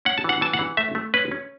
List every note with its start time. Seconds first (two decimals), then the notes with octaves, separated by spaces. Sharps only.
0.05 C#4 F#5
0.18 A5
0.24 E3 F#5
0.41 E3 A5
0.53 F#5
0.59 E3
0.77 A3 E5
0.95 A3
1.14 C#4 B4
1.31 C#4